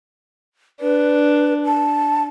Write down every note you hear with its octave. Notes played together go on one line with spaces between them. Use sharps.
D4 B4
A5